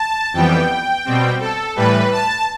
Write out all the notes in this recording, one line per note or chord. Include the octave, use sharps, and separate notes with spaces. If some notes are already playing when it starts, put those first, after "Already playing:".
Already playing: A5
F2 E3 G3 B3 G5
B2 G3 C4
A4
A2 E3 G3 B4
A5